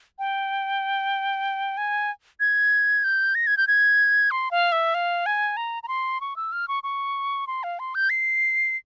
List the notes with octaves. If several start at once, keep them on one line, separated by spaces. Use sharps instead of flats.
G5
G#5
G#6
G6
A#6
G#6
G6
G#6
C6
F5
E5
F5
G#5
A#5
A#5
C6
C#6
E6
F6
C#6
C#6
C6
F5
C6
G6
C7